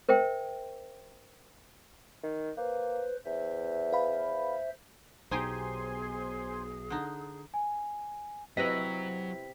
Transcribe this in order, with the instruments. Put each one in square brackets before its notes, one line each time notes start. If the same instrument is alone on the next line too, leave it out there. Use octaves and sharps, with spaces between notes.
[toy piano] A#4 C5 E5 G5
[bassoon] D#3
[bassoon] A#3 [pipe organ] B4 C5
[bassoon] E2 [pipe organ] C5 E5
[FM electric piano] B4 F5 B5
[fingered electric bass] B1 B2 [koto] D#4 G4 [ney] G#4 [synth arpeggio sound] C5 G#5 C6
[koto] D3 D#4
[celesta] G#5
[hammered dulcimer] C3 [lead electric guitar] F#3 [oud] E4 B4 D#5 [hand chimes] B6